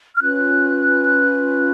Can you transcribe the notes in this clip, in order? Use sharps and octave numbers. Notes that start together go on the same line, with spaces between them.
F6
C#4 F4 B4 F#6